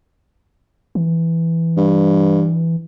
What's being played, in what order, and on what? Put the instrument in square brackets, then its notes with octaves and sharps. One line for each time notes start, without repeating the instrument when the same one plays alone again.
[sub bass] E3
[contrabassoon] G2